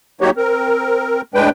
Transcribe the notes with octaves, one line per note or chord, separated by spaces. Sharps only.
F#3 A#3 D#4 F#4 G4 C#5
C4 A#4
A2 G#3 D4 B4 G5